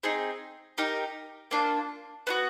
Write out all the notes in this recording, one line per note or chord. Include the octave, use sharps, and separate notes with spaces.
C4 D#4 G#4
D#4 G4 A#4
A#3 D4 F4
B3 D4 F#4